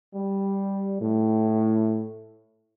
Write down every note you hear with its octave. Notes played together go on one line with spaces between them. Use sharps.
G3
A2